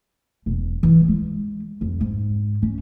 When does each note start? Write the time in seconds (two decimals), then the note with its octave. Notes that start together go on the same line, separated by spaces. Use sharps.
0.46 E1
0.83 E3
1.08 G#3
1.81 F2
2.01 G#2
2.62 C#4